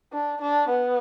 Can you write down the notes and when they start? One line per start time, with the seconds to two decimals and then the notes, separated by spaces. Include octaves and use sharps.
0.13 D4
0.41 D4
0.69 B3